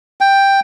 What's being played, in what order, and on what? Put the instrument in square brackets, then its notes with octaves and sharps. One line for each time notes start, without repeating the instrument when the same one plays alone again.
[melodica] G5